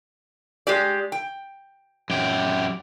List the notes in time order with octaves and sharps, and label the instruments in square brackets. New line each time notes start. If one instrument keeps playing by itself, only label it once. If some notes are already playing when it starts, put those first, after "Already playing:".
[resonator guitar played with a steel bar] G#3 G4 D5
G5
[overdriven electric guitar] F#2 G4